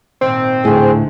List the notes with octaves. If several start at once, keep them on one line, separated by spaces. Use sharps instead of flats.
G#1 A#2 C4
D2 A2 G#4 D#7